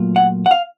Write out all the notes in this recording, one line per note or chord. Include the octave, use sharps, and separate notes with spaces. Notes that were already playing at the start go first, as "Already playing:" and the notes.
Already playing: A#2 F#3 A3 F4
F#5
F#5
F5